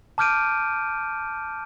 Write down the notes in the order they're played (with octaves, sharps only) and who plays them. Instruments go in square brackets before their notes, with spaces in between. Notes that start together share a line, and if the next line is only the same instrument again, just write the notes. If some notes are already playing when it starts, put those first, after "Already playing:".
[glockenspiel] A5 D6 F6 G6 D7 D#7